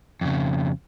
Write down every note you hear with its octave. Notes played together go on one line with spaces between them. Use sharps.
F2 C#3